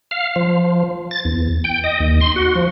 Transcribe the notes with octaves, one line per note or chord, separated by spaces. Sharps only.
F5
F3
A6
E2
G5
D#5
D#2
C6
F#4
F3